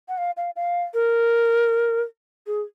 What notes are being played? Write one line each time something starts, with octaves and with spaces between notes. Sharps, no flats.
F#5
F5
F5
F5
A#4
G#4